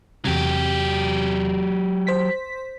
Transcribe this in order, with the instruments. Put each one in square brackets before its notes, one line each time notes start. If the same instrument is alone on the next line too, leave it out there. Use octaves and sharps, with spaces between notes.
[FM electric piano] E2 C3 [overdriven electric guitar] F#3 G4
[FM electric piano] C5 B6